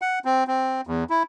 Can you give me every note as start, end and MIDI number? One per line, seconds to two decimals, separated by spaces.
0.02 0.19 78
0.25 0.44 60
0.47 0.81 60
0.87 1.04 40
1.10 1.23 64